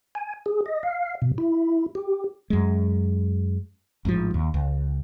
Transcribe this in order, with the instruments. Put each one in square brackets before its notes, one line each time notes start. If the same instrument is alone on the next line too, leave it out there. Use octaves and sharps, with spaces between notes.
[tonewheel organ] G#5
G#4
D#5
F5
B2
E4
G4
[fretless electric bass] F#2 G#3
A1 G#2 C#3 F3
D#2
C#2